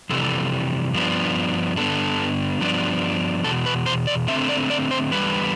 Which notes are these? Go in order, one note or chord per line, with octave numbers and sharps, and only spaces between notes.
F2 C3 E3 G3 A4
G2 F3 B3 D4
G2 D3 F3 B3 D4 A4
G2 F3 B3 D4
E2 B2 A4
B4
C5
D5
D3 A3 C4 E5
D5
D5
C5
E2 D3 G3 B4